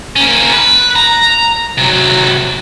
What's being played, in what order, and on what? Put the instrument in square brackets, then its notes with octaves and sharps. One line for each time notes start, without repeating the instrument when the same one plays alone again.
[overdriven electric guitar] A#3 C#4
B4
A#5
C3 F#3